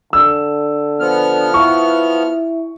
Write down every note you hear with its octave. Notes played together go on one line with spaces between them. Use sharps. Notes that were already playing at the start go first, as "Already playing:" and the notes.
D3 E6
F3 B3 F6
E4 C#6